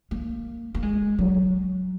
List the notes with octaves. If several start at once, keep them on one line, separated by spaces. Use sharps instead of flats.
A#3
A#3
G#3
F#3